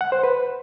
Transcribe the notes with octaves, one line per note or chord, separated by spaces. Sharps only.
F#5
C5
B4